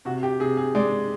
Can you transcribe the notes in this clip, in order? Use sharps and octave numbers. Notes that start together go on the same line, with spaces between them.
C3 F#4
G4
C3 G#4
G#4
G#3 D5